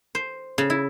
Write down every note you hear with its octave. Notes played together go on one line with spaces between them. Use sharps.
C5
C#3
E4